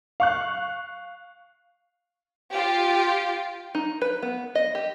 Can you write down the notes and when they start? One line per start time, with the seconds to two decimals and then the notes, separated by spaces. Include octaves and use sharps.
0.20 F5 C#6 F#6
2.52 F4 G4
3.75 D#4
4.02 B4
4.22 B3
4.55 D#5
4.75 G4